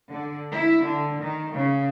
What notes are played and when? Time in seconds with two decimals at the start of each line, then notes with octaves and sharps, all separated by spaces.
0.11 D3
0.52 E4
0.85 D3
1.21 D#3
1.53 C#3